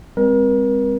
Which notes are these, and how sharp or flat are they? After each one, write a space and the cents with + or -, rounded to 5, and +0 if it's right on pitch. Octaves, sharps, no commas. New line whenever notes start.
G#3 -45 C4 +0 A#4 +40